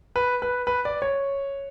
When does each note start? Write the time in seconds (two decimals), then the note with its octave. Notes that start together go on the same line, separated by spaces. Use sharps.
0.16 B4
0.42 B4
0.67 B4
0.85 D5
1.02 C#5